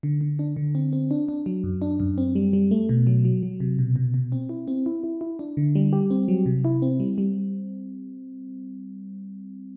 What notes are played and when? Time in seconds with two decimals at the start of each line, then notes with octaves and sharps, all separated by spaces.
0.03 D3
0.21 D3
0.39 D4
0.56 D3
0.75 C4
0.93 C4
1.11 D4
1.28 D4
1.46 F#3
1.64 F#2
1.82 D4
2.00 F#2
2.18 C4
2.35 G3
2.53 G3
2.71 A3
2.89 B2
3.07 F#3
3.25 F#3
3.43 F#3
3.60 C3
3.79 B2
3.96 B2
4.14 B2
4.32 C4
4.49 E4
4.68 C4
4.86 E4
5.03 E4
5.21 E4
5.39 D4
5.57 D3
5.75 G3
5.93 G4
6.10 C4
6.28 F#3
6.46 C3
6.64 E4
6.82 C4
7.00 G3
7.18 G3